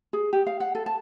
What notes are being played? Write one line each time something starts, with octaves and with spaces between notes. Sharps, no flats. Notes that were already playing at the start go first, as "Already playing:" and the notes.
G#4
G4
F5
F#5
A4
A5